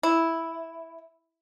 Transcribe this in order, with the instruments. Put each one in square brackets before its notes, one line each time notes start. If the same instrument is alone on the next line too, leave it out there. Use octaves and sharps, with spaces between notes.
[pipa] E4